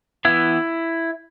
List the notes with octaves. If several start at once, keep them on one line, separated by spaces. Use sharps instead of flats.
E3 B3 E4